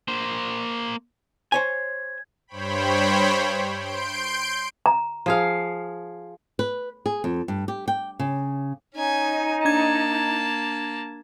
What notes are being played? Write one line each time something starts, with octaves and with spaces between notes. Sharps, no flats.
A#3 C5
C5 C#5 G#5 G#6
G2 C5 C#5 G5 B5
C6 G6 D7
A#5
F3 G#4 F5
B4
G#4
F2
G2
G4
G5
C#3
C#4 D#4 G#5
A#3 D4 A5 G#6